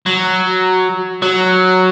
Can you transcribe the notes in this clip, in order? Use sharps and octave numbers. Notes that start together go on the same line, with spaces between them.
F#3
F#3